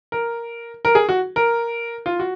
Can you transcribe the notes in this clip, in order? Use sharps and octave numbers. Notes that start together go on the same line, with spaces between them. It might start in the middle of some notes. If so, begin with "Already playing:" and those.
A#4
A#4
G#4
F#4
A#4
F4
F#4